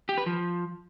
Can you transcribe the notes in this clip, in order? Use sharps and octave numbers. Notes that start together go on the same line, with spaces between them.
G4
B4
F3